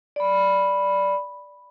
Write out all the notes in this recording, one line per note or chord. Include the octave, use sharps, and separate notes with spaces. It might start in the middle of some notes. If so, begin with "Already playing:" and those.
D5 B5